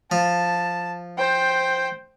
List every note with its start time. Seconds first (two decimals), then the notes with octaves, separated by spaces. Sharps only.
0.12 F3 A5
1.18 C5 G5